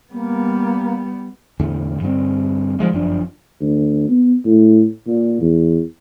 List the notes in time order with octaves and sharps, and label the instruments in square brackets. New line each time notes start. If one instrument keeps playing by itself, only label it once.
[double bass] G3 B3 [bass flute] A#3
[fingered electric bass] E2 A2 D3
G2 D3 G3 C4
D#3 F3 G#3 A#3
G1 F#2 F3 D4
[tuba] D2
B3
A2
A#2
E2